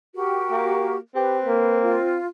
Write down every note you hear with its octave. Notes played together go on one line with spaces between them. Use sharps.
F#4 G4 A#4
A#3
C4 G4 B4
A#3
F4